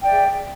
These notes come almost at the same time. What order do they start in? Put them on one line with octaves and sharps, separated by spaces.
G5 D5 E5 G#4